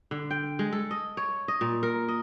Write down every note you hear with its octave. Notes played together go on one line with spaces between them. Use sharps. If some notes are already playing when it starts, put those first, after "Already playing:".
D3
G5
G#3
A4
D#5
C#5
D#5
A#2
A#4
D#5